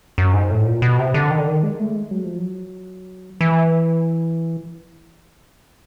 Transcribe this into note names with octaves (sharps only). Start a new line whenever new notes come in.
F#2
G#2
A2
A#2
B2
C3
D3
D#3
D3
D#3
G#3
A3
G#3
F#3
F3
F#3
E3